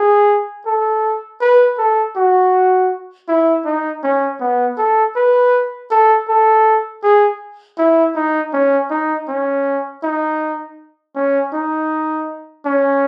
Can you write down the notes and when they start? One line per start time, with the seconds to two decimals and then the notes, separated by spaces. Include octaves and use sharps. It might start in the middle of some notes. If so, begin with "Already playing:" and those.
Already playing: G#4
0.66 A4
1.41 B4
1.78 A4
2.16 F#4
3.28 E4
3.65 D#4
4.03 C#4
4.40 B3
4.78 A4
5.16 B4
5.91 A4
6.28 A4
7.03 G#4
7.78 E4
8.15 D#4
8.53 C#4
8.90 D#4
9.28 C#4
10.03 D#4
11.16 C#4
11.53 D#4
12.65 C#4